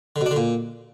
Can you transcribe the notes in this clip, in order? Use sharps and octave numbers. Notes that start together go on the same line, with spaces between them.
D3
B2
D4
D3
A#2